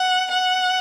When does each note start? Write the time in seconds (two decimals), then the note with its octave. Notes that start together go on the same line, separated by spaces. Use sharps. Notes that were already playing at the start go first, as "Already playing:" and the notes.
Already playing: F#5
0.31 F#5